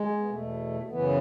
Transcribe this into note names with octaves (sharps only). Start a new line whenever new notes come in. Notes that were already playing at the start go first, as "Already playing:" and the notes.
Already playing: G#3
B3
E2 B2 A3
A3
F#2 C#3 E3 B3